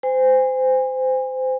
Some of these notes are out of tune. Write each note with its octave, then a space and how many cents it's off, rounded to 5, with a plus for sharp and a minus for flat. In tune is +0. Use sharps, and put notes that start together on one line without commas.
C5 -25 G#5 -35